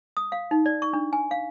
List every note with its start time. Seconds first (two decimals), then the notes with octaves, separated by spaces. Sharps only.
0.17 D#6
0.32 F5
0.51 D#4
0.66 D5
0.82 C#6
0.93 D4
1.13 G#5
1.31 F5